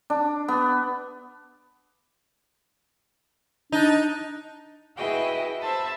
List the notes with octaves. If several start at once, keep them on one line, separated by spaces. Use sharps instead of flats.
D4
B3
D4 D#4
E4 F#4 G#4 B4 D#5 G5
C5 E5 A5 B5